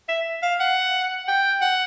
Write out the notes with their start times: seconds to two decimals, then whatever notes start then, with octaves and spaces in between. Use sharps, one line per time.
0.09 E5
0.43 F5
0.60 F#5
1.28 G5
1.61 F#5